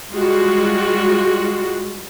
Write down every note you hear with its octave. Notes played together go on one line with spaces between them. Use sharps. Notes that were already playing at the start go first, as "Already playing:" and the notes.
G3 G#3 F4 F#4